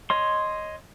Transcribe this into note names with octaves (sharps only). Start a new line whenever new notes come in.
C#5 D#5 C6